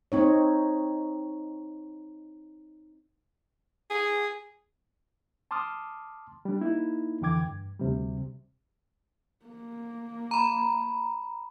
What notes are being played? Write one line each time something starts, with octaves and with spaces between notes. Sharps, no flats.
C4 D#4 C#5
G#4
A5 C6 D6 D#6 F6
G3 D4
A#3 D#4 E4
F2 D3 E3 G5 D6 G#6
G2
D2 C3 G3
A#3
A#5 B5